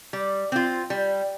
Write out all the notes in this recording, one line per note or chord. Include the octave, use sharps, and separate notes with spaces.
G3
C4 F4
G3